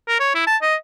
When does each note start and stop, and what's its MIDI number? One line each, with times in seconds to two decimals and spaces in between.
0.08 0.17 70
0.20 0.31 73
0.35 0.46 64
0.47 0.57 81
0.62 0.76 75